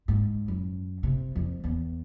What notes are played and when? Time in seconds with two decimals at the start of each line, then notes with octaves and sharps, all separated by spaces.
0.08 G#2
0.48 F#2
1.03 C3
1.36 F2
1.64 E2